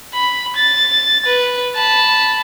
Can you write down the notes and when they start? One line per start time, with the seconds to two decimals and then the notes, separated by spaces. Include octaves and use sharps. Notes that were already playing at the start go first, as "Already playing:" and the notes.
0.14 B5
0.56 A6
1.26 B4
1.75 A5 B5